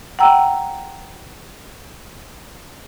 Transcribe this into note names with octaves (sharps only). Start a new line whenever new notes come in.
F#5 G5 A#5 E6